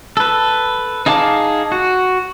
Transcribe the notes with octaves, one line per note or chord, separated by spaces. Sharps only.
A4 B4
D#4 G#4 F5 A5 D6
F#4